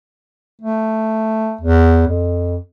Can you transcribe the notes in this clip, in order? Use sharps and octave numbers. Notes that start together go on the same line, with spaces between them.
A3
E2
F2